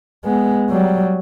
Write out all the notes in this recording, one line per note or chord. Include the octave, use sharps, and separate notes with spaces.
G#3 B3
F#3 G3